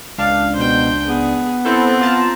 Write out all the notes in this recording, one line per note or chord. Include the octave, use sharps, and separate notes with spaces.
C#2 D4 F5
B2 C5 G5
B3 G#4
C4 E4 A4 C5
F4 A5 A#5